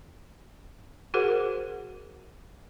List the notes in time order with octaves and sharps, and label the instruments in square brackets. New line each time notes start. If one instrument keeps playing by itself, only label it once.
[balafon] F#4 G#4 A#4 C5 F#5